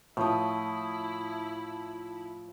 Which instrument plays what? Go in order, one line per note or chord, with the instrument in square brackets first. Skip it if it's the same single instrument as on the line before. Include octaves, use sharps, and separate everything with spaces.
[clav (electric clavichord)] A2 [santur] F3 D#6 [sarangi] E4